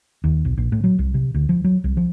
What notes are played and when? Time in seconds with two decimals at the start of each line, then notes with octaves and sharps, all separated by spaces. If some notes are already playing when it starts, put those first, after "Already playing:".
0.24 D#2
0.45 B1
0.57 A#1
0.72 A2
0.84 F#3
0.99 C2
1.14 C3
1.34 D2
1.49 F3
1.64 F#3
1.84 C2
1.97 F3